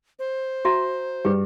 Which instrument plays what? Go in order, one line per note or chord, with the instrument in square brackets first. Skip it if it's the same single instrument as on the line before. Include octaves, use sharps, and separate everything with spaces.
[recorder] C5
[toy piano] F#4 E5 A#5
[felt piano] G2 [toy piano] G4 G#4 B4